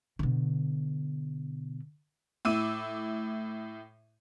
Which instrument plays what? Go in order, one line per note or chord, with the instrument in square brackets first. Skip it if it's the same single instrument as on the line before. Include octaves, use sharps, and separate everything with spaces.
[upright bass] B2 D3
[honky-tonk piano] A2 E4 D6 E6 D#7